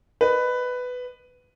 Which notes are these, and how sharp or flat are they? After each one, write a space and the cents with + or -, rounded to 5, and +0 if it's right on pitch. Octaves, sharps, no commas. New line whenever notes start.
B4 +10 D#5 -30